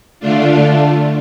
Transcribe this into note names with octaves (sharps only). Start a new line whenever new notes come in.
D3 A3 D4 F4